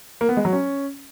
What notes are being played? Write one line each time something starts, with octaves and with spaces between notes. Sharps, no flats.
A#3
B3
G#3
F#3
C#4